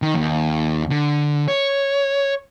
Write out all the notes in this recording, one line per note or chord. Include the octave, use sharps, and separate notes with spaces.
D#3
D#2
D3
C#5